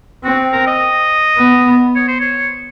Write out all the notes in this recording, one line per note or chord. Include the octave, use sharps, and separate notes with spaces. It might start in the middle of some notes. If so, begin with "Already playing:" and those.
C4 F#4
A#4
D#5
B3
C#5
C5
C#5